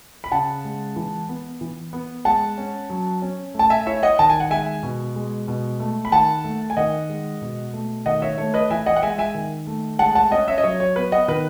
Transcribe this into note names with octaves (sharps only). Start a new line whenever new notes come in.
B5
C#3 F#5 A5
G#3
E3
B3
E3
B3
G#3 F#5 A5
C#4
F#3
C#4
A3
A5
E5 G#5
E4 C#5 E5
D#5 F#5
D#3 A5
G#5
F#5
G#3 E5 G#5
B2
G#3
B2
A3
B5
D#3 F#5 A5
A3
G#5
D#3 D#5 F#5
G#3
B2
A3
D#3 D#5 F#5
C#5 E5
A3 C#5
B4 D#5
E3 E5 G#5
D#5 F#5
F#5
G#3 E5 G#5
E5 G#5
D#3
A3
G#3 F#5 A5
F#5 A5
C#4 D#5 F#5
C#5 E5
D#5
F#3 C#5
C#5
B3 B4
D#5 F#5
D#3 B4